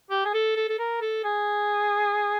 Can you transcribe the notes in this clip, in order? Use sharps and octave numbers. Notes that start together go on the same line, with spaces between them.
G4
G#4
A4
A4
A4
A#4
A4
G#4